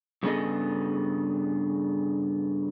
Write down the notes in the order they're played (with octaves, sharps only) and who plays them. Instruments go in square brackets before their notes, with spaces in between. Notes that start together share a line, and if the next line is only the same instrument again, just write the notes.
[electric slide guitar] G2 C#3 B3 G#4 A4 D#5